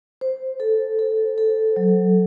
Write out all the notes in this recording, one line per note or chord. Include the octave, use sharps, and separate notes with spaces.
C5
A4
A4
A4
F#3